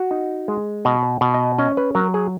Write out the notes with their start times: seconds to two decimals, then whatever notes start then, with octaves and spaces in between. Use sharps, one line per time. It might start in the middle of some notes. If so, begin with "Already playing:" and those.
Already playing: F#4
0.11 D#4
0.48 G#3
0.85 B2 D#5
1.21 B2
1.34 D#5
1.58 C#4 D#5
1.77 B4
1.95 F#3 A#4
2.14 G#4